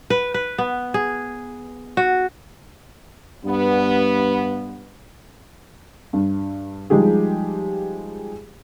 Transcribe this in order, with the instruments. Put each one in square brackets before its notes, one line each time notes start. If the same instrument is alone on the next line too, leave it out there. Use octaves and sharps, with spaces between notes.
[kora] B4
B4
B3
G#4
F#4
[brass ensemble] G2 B3
[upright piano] G2
F3 G3 G#3 D#4 G4 G#4